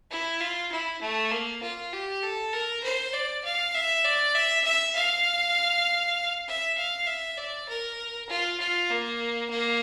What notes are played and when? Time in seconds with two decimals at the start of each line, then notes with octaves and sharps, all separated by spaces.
0.10 E4
0.40 F4
0.72 E4
1.01 A3
1.31 A#3
1.62 F4
1.93 G4
2.23 A4
2.52 A#4
2.83 C5
3.13 D5
3.44 F5
3.75 E5
4.05 D5
4.35 E5
4.64 E5
4.95 F5
6.47 E5
6.77 F5
7.07 E5
7.37 D5
7.68 A#4
8.29 F4
8.59 F4
8.90 A#3
9.50 A#3